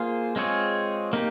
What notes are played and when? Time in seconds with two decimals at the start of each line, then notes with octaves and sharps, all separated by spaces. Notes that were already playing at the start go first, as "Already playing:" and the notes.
Already playing: A#3 F4 G#4 C5 F5
0.36 G#3 C4 F4 G#4 C#5
1.13 A#3 D#4 G4